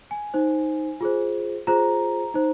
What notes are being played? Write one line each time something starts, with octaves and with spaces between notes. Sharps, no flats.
G#5
D#4 C5
F4 G#4 C5
F4 G#4 C5 A#5
D#4 C5